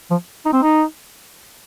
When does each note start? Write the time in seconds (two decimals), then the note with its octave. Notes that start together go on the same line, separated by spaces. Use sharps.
0.10 F3
0.45 D#4
0.53 C4
0.62 D#4